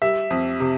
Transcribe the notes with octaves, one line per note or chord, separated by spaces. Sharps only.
G3 E5
F2
C3